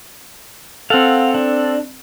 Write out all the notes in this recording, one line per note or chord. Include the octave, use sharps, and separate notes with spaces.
C4 A4 F5 F#5
D4